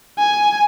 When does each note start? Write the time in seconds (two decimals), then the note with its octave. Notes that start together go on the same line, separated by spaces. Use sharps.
0.19 G#5